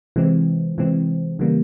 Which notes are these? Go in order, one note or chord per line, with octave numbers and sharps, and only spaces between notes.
C3 E3 G#3 C4
C3 E3 G#3 C4
C#3 E3 G3 A#3